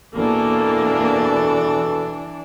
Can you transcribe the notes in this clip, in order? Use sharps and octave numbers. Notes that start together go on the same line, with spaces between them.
E2 B2 E3 A#3 D4 A4